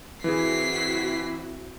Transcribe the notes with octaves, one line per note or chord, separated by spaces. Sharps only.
E3 C4 E4 F#4 G#4 B6 C7